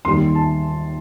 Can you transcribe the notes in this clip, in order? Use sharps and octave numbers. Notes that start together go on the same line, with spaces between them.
D#2 D#3 G3 C6
A5